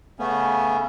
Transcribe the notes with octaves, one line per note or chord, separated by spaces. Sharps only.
C#3 A3 B3 C#4